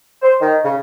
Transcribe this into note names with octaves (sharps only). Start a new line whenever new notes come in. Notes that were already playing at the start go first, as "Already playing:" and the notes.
C5
D#3
C#3